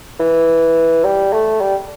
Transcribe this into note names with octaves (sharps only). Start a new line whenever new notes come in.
E3
G3
A3
G3